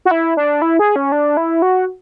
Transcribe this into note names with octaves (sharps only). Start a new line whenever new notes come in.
F#4
E4
D4
E4
G#4
C#4
D4
E4
F#4